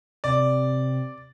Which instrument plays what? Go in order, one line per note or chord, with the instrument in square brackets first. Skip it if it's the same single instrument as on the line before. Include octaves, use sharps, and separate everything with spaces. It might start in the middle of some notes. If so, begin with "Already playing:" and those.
[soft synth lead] C3 [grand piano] D5